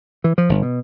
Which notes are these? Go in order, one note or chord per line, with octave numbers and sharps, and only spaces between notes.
E3
F3
G1
B2